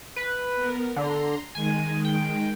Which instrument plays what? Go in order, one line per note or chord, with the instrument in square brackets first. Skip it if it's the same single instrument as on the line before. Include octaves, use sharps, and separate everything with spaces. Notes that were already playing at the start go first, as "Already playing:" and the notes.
[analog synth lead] B4
[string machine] B3 A#4
[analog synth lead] D3 [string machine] A#5 C6
[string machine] D#3 G#3 [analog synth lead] G#5
[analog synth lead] G5